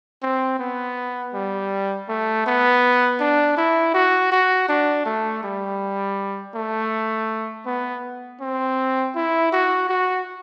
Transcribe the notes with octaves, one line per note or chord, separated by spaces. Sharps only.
C4
B3
G3
A3
B3
D4
E4
F#4
F#4
D4
A3
G3
A3
B3
C4
E4
F#4
F#4